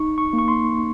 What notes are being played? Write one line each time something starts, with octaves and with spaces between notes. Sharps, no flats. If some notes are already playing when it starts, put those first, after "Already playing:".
Already playing: D#4 C#6
C#6
A#3
C#6
C6